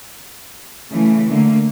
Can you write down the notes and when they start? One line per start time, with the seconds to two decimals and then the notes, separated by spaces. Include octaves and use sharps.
0.90 C#3 E3 A3
1.27 D3 A3 A#3